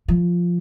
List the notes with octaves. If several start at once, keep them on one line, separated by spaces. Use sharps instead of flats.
F3